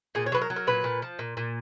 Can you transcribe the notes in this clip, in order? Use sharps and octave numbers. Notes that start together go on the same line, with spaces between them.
A#2 G#4
C#5
F#3 B4
A#4
F#3
A#4
A#2 B4
A#2
F3
A#2
A#2